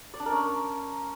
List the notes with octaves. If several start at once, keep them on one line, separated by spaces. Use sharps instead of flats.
D5
D4
A#4
C#4